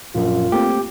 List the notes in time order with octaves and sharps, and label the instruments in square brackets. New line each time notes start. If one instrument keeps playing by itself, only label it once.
[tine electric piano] A#1 F#2 [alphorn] F4
[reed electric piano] A3 A#3 C4 [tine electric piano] G4